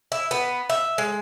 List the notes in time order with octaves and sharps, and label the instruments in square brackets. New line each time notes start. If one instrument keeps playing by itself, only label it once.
[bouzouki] E4
B3
E5
G#3